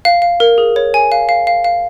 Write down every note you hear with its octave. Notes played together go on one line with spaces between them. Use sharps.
F5
F5
A#4
G#4
C#5
G#5
F5
F5
F5
F5